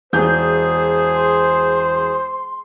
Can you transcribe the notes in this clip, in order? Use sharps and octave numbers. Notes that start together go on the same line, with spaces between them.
E1 G#4 C5 G6
C6